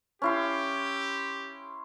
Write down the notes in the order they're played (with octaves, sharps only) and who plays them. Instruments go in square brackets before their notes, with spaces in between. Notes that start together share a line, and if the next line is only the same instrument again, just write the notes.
[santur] C#4 E4 C6 [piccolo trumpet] G4